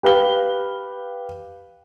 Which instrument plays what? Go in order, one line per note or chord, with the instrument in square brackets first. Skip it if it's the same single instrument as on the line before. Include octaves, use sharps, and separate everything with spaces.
[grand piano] G4 B4 F5 G7